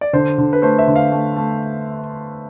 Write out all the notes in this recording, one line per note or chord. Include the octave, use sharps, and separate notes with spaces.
D5
D3 C5
D3
B4
A3 C5
E5
D3
F5
A3
A3